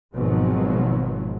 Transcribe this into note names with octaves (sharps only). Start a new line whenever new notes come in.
G#1 G#2 B2 F3 F#3